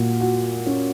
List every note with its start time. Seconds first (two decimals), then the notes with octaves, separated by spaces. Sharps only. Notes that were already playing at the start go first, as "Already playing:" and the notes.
Already playing: A#2 F#4
0.21 F#4
0.66 C#4